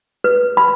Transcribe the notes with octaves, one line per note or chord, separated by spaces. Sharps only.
B4
B5